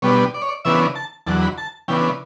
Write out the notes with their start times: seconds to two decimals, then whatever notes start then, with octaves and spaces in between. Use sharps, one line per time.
0.02 B2 G3 B3 D4 C#5
0.34 D5
0.42 C#5
0.48 D5
0.65 C#3 E3 B3 D4 E5
0.95 A5
1.26 E2 D3 F#3 A5
1.42 B5
1.58 A5
1.88 C#3 E3 B3 D4 G5